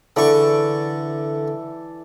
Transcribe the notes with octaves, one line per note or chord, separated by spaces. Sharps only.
D3 E3 A4 D5 C#6